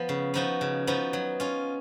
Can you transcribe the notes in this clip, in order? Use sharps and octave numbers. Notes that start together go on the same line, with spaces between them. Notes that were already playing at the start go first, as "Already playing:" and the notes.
Already playing: F3 B3
C#3
F3 B3 D#4 F#4
C#3
F3 B3 D#4 F#4
F#3
C#4 F4